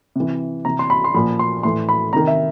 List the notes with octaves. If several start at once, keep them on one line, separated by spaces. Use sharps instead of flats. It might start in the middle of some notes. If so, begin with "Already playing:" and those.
C3 E3
C3 E3 A#5
C6
B5
C6
A#2 F3 B5
C6
A2 E3 C6
B5
C3 D#3 A#5
E5